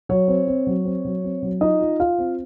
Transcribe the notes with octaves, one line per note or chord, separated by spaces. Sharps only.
F#3 C#5
C4
C4
F#3
C4
F#3
C4
F#3
D#4 F4 D#5
F4
F4 F5
C4